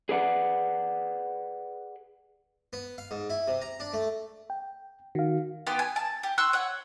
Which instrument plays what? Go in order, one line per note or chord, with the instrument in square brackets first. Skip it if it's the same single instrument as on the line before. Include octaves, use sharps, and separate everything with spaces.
[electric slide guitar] G#4 B4 D5 F5 F#5
[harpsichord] B3
F5
G#2
E4
C3
A#5
D4
A3
[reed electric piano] G5
[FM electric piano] D#3 [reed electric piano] F#4 F5
[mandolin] B3 G4 B4 C6
G#5
A5
G4
C6 C#6 E6 F#6
C#5 F#5